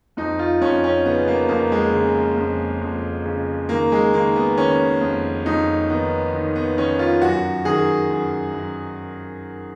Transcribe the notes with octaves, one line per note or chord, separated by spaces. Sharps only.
F2 D#4
F4
F2 C#4
C#4
C#3 B3
A#3
F2 A#3
G#3
C#3
F2
F2
C#3
D#3 A#3
G#3
D#3 A#3
B3
D#3 C#4
F2
F2 D#4
D#3 B3
D#3
B3
D#3 C#4
F4
F#2 F#4
D#3 G#4
F#2
F#2